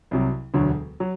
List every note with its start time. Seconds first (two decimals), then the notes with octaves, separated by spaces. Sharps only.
0.11 C2 C3 F#3
0.54 E1 D2 D3 F#3
1.00 F#3